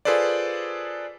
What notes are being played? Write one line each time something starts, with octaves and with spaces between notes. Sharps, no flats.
F4 G#4 A4 B4 C5 D5